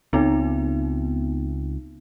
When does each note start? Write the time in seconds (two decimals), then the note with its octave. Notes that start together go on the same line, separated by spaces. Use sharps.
0.13 C#2 B3 C4 D#4